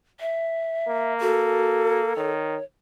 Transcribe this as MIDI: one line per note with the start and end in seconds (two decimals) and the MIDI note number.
0.20 1.13 76
0.88 2.12 58
1.21 2.00 66
1.21 2.30 69
2.17 2.57 51
2.17 2.63 73